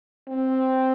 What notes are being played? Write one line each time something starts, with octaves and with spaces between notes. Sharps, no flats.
C4